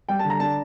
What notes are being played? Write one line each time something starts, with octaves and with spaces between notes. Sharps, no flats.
G3 G5
A5
D3
A#5
D4 A5